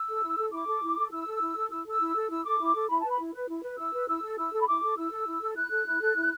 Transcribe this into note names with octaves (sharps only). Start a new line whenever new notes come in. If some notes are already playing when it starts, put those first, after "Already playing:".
Already playing: E6
A4
E4
A4
E4 D6
A4
E4
A4
E4 E6
A4
E4
A4
E4 E6
A4
E6
E4
A4
E4 E6
A4 D6
E4
A4
E4 B5
A5
B4
B5
E4
B4
E4
B4
E4 E6
B4
E4 E6
A4
E4 E6
A4
B5
E4 D6
A4
E4 E6
A4
E4
A4
E4 F#6
A4
E4
A4
E4